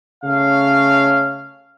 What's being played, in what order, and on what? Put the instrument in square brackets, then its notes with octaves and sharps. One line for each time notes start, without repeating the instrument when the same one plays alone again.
[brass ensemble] C#3 A3 C#4 F5